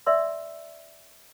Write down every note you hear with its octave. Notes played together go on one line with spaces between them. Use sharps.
D5 E5 C6 E6